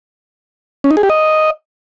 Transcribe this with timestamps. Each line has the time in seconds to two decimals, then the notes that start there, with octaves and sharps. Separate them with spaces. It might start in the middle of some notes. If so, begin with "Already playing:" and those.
0.84 C#4
0.91 D#4
0.97 G#4
1.03 G4
1.10 D#5